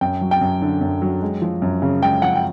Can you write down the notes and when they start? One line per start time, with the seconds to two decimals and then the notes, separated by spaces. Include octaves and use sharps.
0.01 F#2 G5
0.21 F#3
0.31 G5
0.41 F#2
0.62 D3
0.81 F#2
1.02 F#3
1.22 G#3
1.42 F3
1.62 F#2
1.82 C#3
2.02 G#3 G5
2.22 F3 F#5
2.36 G5